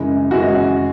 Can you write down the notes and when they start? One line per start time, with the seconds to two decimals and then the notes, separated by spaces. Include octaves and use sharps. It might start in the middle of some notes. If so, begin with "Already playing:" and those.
Already playing: F#2 C#3 E3 G#3
0.31 F#2 C#3 E3 G#3 F#4